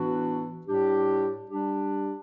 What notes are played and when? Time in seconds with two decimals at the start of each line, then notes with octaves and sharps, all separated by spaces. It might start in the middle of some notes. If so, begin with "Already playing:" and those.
Already playing: A2 E3 B3 D4 F#4
0.66 A2 G3 D4 G4
1.49 G3 D4 G4